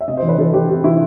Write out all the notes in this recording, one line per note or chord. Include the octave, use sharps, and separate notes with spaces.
E5
C3 D#5
C5
E3
B4
E3 A4
E3 G4
C3 G4
E3 E4